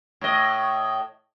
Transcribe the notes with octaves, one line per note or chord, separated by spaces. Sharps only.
A2 D#5